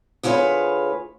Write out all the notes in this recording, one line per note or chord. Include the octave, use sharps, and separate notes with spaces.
D2 F4 G#4 B4 C#5